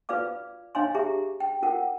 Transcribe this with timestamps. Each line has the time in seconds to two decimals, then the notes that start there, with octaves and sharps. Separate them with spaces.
0.09 F4 B4 D5 F5 D6
0.75 D4 C#5 D#5 F5 G#5 C6
0.95 G4 G#4 E5 A#5
1.40 G5
1.63 F4 A#4 F#5 G5